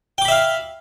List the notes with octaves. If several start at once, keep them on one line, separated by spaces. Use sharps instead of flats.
E5 F5 G5 B5 D6